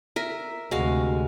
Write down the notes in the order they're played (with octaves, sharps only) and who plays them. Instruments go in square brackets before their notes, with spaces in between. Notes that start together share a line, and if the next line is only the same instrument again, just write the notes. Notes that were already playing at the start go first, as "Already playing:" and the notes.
[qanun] A#4 E5
[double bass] D2 C3 [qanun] G#3 F#4 F5